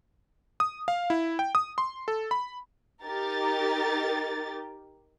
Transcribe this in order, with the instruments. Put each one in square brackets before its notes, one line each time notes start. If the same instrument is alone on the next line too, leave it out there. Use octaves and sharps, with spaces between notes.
[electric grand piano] D#6
F5
E4
G5
D#6
C6
A4
B5
[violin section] D#4 G4 A#4 A6